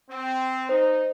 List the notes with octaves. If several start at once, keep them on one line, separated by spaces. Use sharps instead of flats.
C4
D#4 C5